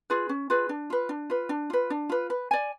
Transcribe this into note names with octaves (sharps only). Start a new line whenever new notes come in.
F4 G#4 B4
C#4
F4 G#4 B4
D4
F4 B4
D4
F4 B4
D4
F4 B4
D4
F4 B4
B4
D5 G#5